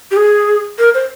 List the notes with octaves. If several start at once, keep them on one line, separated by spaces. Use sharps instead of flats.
G4
G#4
A#4
C5